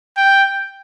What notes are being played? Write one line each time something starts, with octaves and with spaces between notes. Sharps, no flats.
G5